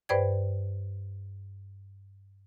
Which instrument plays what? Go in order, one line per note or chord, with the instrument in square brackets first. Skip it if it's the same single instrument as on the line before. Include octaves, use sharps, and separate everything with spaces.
[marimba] G2 B4 C5 D5 G5 G#6